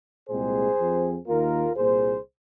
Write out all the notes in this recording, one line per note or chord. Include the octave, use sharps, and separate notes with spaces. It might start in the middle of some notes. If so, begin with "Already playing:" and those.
C2 A#2 G#3 C4 G#4 C5
F2 F3 C4
D#2 D#3 A#3 F4 A#4
C2 A#2 A#3 G#4 C5